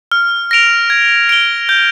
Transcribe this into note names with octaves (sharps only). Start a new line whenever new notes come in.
F6
A#6 D7 F7
G#6
D7 G7
G6